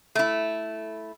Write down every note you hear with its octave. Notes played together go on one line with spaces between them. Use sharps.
A3 E4